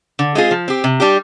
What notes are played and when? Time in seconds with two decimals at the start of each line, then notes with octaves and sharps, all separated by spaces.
0.19 D3
0.35 G#3 C4 F4 G#4
0.51 F3
0.68 C4 G4
0.84 C3
1.00 G3 D4 G4